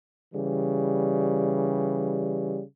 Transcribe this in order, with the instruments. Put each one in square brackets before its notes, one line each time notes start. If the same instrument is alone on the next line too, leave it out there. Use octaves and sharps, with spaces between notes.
[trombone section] C#3 E3 G3